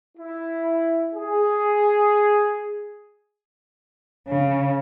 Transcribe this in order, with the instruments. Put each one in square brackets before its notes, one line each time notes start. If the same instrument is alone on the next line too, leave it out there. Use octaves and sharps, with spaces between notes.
[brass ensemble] E4
G#4
[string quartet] C#3